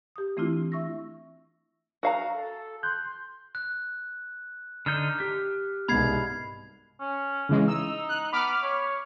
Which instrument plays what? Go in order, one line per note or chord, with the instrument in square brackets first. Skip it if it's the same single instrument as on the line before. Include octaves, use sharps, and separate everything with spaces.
[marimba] G4 D#6
E3 A3 C4 D4 E4 F4
E5 C#6 E6 A#6
[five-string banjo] F#4 F5 A#5
[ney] A4
[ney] C6 [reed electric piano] F#6 G6
[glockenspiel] F#6
[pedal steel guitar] D3 D#4 G6 [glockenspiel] F6
[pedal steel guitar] G4
[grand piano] C2 G#2 B2 [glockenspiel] B5 G#6 C7
[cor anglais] C#4
[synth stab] C#3 E3 G#3
[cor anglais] D#4 [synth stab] E6
[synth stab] F#6
[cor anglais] B3 [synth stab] B5 D6 F6
[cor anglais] C#5